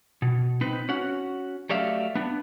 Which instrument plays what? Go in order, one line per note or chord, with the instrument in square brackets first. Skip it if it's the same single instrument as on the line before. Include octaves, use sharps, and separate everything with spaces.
[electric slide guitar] B2
C4 D#4 B4
C#4 F#4 F#5
F#3 A3 G4 D5 E5 F5
B3 D4